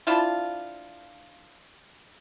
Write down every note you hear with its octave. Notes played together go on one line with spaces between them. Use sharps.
F3 D4 E4 F4